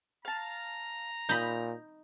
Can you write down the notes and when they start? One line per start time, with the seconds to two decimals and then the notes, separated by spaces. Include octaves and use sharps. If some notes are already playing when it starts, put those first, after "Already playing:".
0.25 F5 A5 A#5
1.29 A#2 D#4 B5 G6